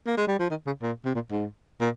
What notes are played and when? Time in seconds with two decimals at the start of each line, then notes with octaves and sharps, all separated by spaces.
0.06 A#3
0.17 G#3
0.28 G3
0.39 F3
0.50 D#3
0.66 C#3
0.82 A#2
1.05 C3
1.15 A#2
1.31 G#2
1.80 A#2